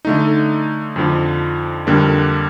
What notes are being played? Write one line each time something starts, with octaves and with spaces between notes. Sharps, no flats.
D3 A3 D#4
F2 D3 F3
F2 D3 G3 A#3 D4